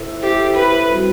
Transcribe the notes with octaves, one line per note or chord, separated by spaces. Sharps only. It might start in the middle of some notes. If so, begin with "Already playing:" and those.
Already playing: E4 A4 C5 E5
E4 G4 A4 C5 E5
B4
G3 C4 F#4 C5